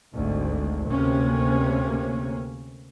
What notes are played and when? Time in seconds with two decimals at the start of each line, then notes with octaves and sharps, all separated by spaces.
0.15 G#1 D2 G#2
0.90 D2 C3 A#3 C#4